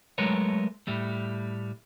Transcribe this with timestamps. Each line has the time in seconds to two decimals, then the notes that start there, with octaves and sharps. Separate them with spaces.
0.18 F#3 G#3 A3 A#4 B4 C#5
0.87 A2 G3 A3